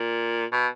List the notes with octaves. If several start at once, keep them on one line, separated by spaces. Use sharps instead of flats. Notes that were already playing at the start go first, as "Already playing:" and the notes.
Already playing: A#2
B2